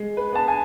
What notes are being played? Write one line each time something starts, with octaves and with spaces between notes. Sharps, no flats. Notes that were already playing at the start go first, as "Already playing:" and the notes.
Already playing: G#3
B4
B3 A5
G#5